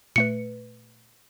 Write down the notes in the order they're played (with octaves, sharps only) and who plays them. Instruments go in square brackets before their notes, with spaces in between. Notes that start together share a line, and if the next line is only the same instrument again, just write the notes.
[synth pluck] A#2 A3 B4 [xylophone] C#7